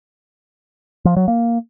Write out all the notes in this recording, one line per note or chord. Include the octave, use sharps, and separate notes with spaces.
F3
F#3
A#3